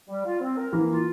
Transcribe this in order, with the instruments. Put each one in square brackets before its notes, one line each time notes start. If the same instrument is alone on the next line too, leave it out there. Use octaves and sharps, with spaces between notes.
[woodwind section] G3
F4
C4
A#4
[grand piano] E3 [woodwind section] A#3
[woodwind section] F4